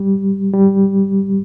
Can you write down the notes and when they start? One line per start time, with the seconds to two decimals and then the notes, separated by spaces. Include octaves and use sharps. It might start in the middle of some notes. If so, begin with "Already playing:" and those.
Already playing: G3
0.53 G3